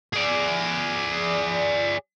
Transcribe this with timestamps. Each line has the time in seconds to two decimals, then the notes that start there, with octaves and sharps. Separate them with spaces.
0.13 G#4 D5